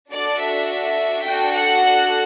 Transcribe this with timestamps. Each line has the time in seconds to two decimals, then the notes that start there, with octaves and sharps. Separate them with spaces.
0.12 D4 F#4 A4 D5
0.40 E5
1.25 D4 F#4 A4 G5
1.53 F#5